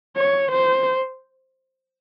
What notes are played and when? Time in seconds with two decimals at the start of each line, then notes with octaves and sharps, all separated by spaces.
0.16 C#5
0.51 C5